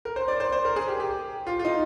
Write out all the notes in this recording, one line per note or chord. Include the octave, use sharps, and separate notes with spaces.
A#4
C5
D5
C5
C5
A#4
G#4
G4
G4
F4
F4
D#4